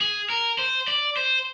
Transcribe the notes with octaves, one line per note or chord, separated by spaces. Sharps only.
G#4
A#4
C5
D5
C5